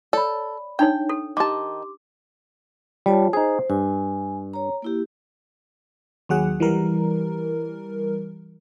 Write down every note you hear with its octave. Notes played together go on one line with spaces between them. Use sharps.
A4 C#5 D5 B5
D4 D#4 C#5 G5
A4
D#3 G4 A5 C6 D6
G3 F4 C#5 A5
D#4 G#4 C5
G2 G#5
C#5 A#5
A#3 E4 G4
D#2 F#3 G#4 F#5
E3 G3 A#4